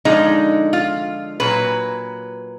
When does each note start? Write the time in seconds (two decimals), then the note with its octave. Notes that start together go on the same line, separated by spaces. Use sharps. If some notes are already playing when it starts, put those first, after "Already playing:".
0.05 D3 F3 G#3 D#4
0.73 F4
1.40 A#2 F#3 B4